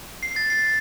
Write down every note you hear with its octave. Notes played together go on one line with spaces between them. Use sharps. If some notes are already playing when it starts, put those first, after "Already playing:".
C7
A6
C7